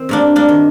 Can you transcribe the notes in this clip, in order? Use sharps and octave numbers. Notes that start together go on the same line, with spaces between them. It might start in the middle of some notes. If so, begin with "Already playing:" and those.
Already playing: D#3 C4
G2 A#3 D4
A#3 D4
D#3